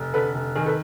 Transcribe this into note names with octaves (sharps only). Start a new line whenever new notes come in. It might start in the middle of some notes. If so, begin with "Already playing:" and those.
Already playing: F1
D3 A4 B4
F1
D#3 G#4 A#4
A4 B4